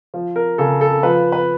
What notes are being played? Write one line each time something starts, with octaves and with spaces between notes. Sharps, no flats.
F3
A#4
C#3 A4
A4
F3 B4
B4